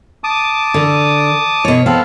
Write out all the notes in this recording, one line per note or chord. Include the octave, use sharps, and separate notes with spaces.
A5 D6 D#6
D3
B2 C#5
B3 C4 A4 F5